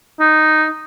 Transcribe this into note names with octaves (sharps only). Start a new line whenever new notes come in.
D#4